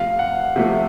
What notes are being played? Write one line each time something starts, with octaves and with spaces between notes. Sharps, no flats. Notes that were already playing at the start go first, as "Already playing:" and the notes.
Already playing: C3 F3 A3 F5
F#5
C3 F3 A3